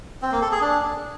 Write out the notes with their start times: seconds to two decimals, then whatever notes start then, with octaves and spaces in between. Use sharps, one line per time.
0.22 C4
0.32 A#3
0.42 A4
0.52 G#4
0.61 D4